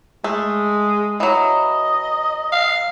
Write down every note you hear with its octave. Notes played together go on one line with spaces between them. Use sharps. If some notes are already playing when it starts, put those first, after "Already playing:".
G#3 A3
E3 F#3 D#5
F5